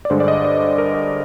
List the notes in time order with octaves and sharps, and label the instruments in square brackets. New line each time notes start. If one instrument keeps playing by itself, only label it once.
[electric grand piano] D5
G2 D3 G#3 C5
D5
D#5
D5
A#4
D#5